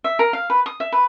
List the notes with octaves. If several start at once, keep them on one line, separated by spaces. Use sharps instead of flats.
E5
A#4
F5
B4
D#6
E5
B4